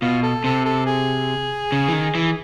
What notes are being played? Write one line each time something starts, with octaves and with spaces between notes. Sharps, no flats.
B2 F4
A4
C3 A4
A4
G#4
C#3
E3
D#3
E3